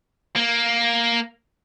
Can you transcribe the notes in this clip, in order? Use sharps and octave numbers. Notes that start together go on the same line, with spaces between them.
A#3